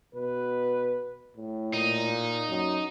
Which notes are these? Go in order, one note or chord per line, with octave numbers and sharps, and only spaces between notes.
B2 B4
A2
A#2 D#4
F#2